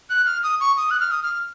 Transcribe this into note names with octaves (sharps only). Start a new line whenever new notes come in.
F#6
F6
D#6
C#6
D#6
F#6
F6
D#6
F6